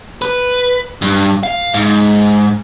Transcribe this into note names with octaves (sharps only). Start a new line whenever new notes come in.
B4
G2
F5
G#2